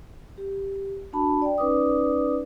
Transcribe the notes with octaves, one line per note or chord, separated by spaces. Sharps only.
G4
D4 F#4 A5 B5
D5 G5
C#4 D#4 B4 D5 D6 D#6